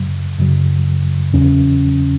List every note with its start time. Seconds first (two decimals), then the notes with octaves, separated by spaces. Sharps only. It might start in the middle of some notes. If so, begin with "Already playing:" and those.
Already playing: F#2 C#3 F#3
0.39 F#2 C#3 F#3
1.33 E2 C#3 F#3 C#4